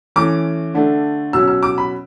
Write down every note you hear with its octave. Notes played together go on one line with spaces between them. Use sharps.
E3 A3 C#4 D6
D3 A3 D4
B2 F#3 C#4 E6
E6
D6
B5